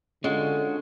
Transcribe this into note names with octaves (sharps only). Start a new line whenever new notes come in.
D3 G#3 C#4 F4 F#4